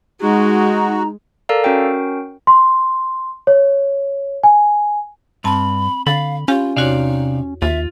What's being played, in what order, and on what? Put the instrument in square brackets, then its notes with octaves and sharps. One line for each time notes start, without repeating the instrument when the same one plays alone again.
[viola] G#3 [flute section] D#4 A#5 [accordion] F#4
[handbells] A4 A#4 D5 F5 A#5
C#4 F#4 A#4 G5
[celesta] C6
C#5
G#5
[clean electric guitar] G2 [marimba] C4 A5 [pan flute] B5
[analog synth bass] D3 [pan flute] F5 [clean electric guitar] B5 [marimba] A6
[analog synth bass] C#4 [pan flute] F4 [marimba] G4 F5
[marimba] E2 F#4 C#5 [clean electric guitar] C3 D5 F5 [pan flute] D#4
[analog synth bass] D#2 [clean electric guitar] F4 [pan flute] E5